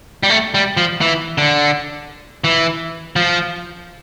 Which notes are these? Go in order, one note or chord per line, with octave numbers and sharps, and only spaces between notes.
G3
A3
G3
F3
E3
D3
E3
F3